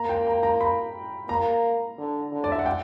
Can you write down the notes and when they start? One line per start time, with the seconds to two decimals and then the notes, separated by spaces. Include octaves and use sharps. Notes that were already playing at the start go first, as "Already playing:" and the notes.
Already playing: A#3 A#5
0.09 G5
0.27 A#5
0.43 A#5
0.61 B5
1.29 A#3 A#5
1.98 D3
2.32 D3
2.44 D5
2.52 E5
2.59 F#5
2.66 G5